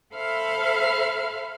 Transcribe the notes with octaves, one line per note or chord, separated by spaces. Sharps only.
A4 C5 E5 F5 B5 F6